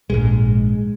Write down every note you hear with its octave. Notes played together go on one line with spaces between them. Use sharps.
A#1 G#2 G#3